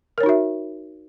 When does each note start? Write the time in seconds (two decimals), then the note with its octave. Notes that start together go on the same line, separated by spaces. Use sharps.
0.18 A#4
0.20 C#5
0.23 D#4
0.26 F#4
0.29 E5